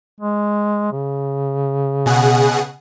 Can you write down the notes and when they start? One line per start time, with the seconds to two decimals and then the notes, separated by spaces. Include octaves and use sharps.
0.20 G#3
0.92 C#3
2.06 B2 G#4 F#5